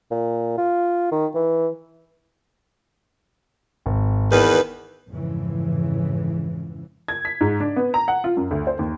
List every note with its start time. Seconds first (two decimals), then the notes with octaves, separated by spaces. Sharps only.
0.11 A#2
0.58 F4
1.12 D#3
1.35 E3
3.86 G#1
4.31 E2 D#3 B4
5.09 F2 G#2 C#3 E3
7.08 G#6
7.25 B6
7.41 G#2
7.60 D4
7.76 B3
7.94 A#5
8.08 F#5
8.24 F4
8.37 F#2
8.51 D2
8.67 C5
8.79 D#2